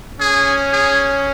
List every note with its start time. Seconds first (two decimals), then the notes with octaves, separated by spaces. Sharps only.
0.20 C#4 G#4
0.72 G#4